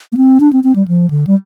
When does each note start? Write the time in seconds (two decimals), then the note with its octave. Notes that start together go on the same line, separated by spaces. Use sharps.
0.12 A#3
0.17 C4
0.40 D4
0.53 C4
0.64 C4
0.76 G3
0.88 F3
1.10 D3
1.27 G3